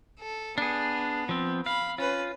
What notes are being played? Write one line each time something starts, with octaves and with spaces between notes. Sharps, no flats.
A4
B3 D4 G#4
F3 C4
F5 B5
C#4 F4 B4